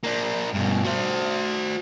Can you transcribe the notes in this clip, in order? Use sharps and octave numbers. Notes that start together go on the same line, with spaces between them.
A#3 D4
G2 B2
F#4 C5